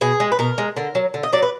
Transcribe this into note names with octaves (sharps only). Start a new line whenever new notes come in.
B2 G#4
G#3
B4
B2 A#4
G#3
D3 A#4
F#3
D3
D#5
F#3 D5
B4